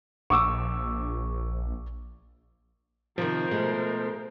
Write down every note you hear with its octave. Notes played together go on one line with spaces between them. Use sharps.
A#1 C#6 D6 E6
C3 D#3 F3 A#4 C5
B2 G#3 A3